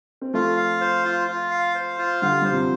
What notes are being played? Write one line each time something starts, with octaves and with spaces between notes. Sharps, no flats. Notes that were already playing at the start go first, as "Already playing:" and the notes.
C4
F3 A3 F4
F5
C5
F4
F4
F5
C5
F4
D3 G3 F5
G3 C5
C3 F3